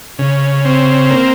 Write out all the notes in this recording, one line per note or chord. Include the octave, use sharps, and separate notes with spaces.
C#3
C4
A#3